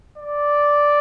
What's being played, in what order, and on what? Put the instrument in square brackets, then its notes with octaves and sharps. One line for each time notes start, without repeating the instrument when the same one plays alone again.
[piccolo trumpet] D5